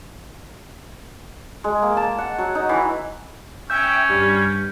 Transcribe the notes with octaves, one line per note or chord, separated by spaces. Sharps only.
G#3
A#3
A5
F#5
F#3
D#4
E3
C#4 E5 G5 G6
G2 G3